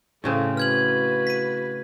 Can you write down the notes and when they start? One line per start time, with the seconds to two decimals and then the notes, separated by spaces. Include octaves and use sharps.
0.24 A2 C#3 C4 A4
0.57 F#4 B4 F6 G#6 F#7
1.27 B6 D#7